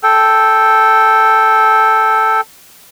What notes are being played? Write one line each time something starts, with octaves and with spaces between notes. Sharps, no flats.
A4 G5